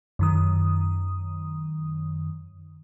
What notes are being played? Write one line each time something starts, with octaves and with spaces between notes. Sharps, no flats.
F#2 D#3 D#6